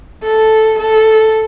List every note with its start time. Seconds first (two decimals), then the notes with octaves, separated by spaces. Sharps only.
0.24 A4
0.79 A4